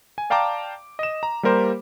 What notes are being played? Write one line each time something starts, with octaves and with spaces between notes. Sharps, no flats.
G#5
D5 F5 G5 A5 A#5 D6
D#5 E7
A#5
G3 A#3 G4 A#4 C5